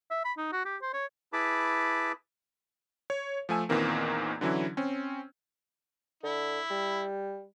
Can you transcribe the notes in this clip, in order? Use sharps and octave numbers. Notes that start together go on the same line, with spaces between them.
E5
B5
D#4
F#4
G4
C5
C#5
E4 G#4 B4 A5 B5 D6
C#5
F3 A3 G#5 E6
E2 A#2 D#3 E3 A#3 C4
D3 E3 F#3 C#4 E4
C4 C#4
D3 E4
G3